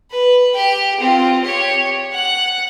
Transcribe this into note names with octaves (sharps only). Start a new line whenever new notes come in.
B4
G4 G5
C4 F4
G4 C#5
F#5 F#6